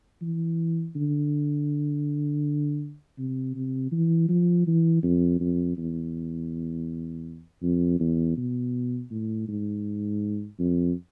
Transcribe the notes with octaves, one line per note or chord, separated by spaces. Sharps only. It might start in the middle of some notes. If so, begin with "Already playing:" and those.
E3
D3
C3
C3
E3
F3
E3
F2
F2
E2
F2
E2
B2
A2
G#2
F2